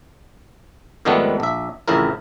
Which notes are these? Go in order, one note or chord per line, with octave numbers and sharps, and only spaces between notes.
F2 G#2 D#3 G3 A3 B3
A#1 E5
A1 F2 C#3 E4 A#4